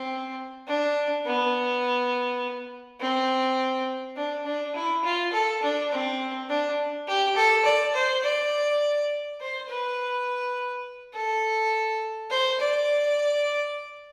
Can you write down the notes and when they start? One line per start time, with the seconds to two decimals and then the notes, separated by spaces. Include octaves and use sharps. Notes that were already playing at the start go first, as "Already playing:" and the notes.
Already playing: C4
0.68 D4
1.26 B3
3.00 C4
4.16 D4
4.46 D4
4.75 E4
5.04 F4
5.32 A4
5.62 D4
5.91 C4
6.49 D4
7.07 G4
7.36 A4
7.65 D5
7.94 C5
8.23 D5
9.40 C5
9.68 B4
11.14 A4
12.30 C5
12.60 D5